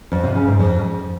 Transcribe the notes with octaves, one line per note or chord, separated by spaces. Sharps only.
F2
C3
C#3
G#2
F2